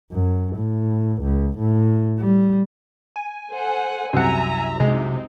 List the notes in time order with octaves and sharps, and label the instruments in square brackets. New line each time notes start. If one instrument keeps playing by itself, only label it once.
[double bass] F#2
A2
C#2
A2
G3
[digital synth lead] G#5
[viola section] A4 C5 F#5
[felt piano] C2 F#2 [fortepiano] C4 F#5 [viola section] E5 A#5
[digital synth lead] C3 [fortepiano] G#3 [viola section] C4 D#4